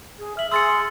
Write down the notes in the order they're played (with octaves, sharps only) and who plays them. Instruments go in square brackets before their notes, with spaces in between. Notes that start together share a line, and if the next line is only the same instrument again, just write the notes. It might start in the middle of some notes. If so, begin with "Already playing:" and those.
[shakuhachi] G#4
[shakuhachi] E5 [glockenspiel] F6 F#7
[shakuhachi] G#4 [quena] C6 [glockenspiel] E6 A6 C#7